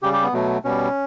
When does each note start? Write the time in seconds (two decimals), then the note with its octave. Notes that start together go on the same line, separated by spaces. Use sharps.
0.03 C#3 G3 G4
0.13 G4
0.23 B3
0.33 B2 F#3 A3
0.64 B2 G3 C#4